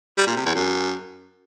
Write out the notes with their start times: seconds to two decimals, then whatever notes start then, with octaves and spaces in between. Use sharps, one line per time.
0.17 G3
0.27 A#2
0.36 C3
0.46 E2
0.55 F#2